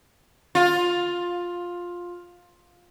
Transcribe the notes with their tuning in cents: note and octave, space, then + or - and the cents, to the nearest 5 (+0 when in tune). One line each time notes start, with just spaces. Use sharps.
F4 +10